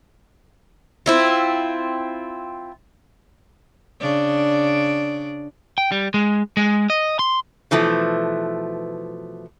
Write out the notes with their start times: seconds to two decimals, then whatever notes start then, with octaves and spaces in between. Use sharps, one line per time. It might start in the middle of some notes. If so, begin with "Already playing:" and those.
1.06 C4 E4 F4
4.01 C#3 D4 D5
5.78 G5
5.92 G3
6.14 G#3
6.57 G#3
6.90 D#5
7.19 C6
7.71 B2 E3 F3 A3